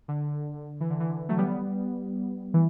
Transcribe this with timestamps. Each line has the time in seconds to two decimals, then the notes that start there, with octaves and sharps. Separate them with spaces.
0.08 D3
0.80 E3
0.90 D3
1.00 E3
1.10 D3
1.29 F#3 A3
1.38 G3 B3
2.54 E3